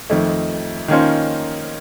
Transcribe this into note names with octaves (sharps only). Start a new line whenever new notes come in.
F2 D#3 A3
D#3 A#3 C#4 F4 C5